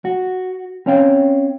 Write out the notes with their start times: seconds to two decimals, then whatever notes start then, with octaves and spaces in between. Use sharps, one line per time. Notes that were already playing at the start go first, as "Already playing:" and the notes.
0.05 F#4
0.86 C4 C#4 C#5 F5 G5